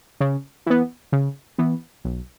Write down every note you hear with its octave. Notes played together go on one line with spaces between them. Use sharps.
C#3
E3 B3
C#3
E3 B3
B1